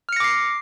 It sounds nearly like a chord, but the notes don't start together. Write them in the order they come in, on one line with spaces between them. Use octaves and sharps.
F6 C#7 A#6 D6 C7